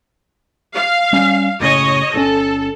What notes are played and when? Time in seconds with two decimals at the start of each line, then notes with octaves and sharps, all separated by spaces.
0.74 F5
1.13 G3 C#4
1.60 F#1 A2 C#3 C#5 D#5
2.14 G1 C3 C#4 A4